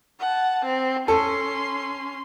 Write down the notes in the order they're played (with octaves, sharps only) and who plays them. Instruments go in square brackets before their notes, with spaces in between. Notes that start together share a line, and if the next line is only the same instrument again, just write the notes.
[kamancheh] F#5 A5
C4
[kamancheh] C#4 C6 [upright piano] A4